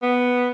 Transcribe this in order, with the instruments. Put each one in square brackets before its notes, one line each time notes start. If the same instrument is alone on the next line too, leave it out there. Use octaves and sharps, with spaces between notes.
[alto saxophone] B3